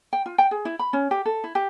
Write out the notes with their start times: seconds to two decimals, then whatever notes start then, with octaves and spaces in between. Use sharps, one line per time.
0.13 G5
0.26 F4
0.38 G5
0.51 G#4
0.65 E4
0.79 B5
0.93 C#4
1.11 G4
1.26 A4
1.44 E4
1.55 G4